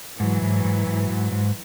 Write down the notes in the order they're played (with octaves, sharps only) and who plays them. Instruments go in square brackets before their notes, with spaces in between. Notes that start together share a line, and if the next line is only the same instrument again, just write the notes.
[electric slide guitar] G#2 [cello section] E3 F#3
[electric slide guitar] G#2
G#2
G#2
G#2
G#2